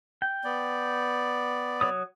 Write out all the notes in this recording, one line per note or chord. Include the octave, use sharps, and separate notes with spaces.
G5
B3 D5
F#3 C#5 D#6